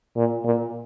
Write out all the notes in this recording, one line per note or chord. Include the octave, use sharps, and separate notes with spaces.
A#2
A#2